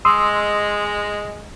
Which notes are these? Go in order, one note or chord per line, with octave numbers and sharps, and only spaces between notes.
G#3 C6 D#6 E6